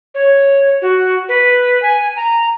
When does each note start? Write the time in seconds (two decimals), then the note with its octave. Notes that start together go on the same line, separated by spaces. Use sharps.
0.15 C#5
0.82 F#4
1.29 B4
1.82 G#5
2.16 A#5